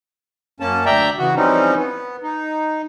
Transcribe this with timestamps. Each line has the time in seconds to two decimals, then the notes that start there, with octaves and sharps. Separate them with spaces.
0.60 F#2 A#3 C#4 A5
0.86 D2 D5 E5 G5 A#5
1.18 C#3 E3 F#4
1.35 E3 F3 G3 C4 C#4 D#4
1.77 B3
2.23 D#4